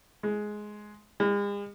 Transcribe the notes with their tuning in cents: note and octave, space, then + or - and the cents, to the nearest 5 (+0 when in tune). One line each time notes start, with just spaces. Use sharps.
G#3 +10
G#3 -45